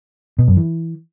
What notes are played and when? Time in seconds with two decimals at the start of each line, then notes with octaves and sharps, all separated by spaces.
0.39 B2
0.48 F#2
0.57 E3